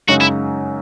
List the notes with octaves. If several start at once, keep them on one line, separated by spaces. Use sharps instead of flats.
F#2 C#3 G#3 D#4 F#4
E4